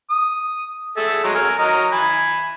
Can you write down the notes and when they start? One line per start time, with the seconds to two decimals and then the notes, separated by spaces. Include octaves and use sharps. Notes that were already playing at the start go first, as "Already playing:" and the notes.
0.10 D#6
0.97 G#4 A4 E5
1.24 F#3 G#3 A3
1.35 A#4 G#5
1.59 F#3 A#4 D#5
1.92 G#5 B5